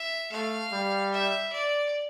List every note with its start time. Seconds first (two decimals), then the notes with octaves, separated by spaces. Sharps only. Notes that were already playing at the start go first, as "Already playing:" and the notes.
Already playing: E5
0.32 A3 F5
0.72 G3
1.12 E5
1.52 D5